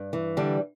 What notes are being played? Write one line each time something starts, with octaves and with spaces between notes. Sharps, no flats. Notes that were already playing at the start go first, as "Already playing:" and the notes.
Already playing: G2
E3
D3 G3